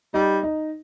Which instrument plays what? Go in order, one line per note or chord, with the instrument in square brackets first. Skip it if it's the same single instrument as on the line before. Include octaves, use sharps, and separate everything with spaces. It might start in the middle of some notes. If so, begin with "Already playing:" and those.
[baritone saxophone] G3 [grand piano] D#4
[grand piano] D#4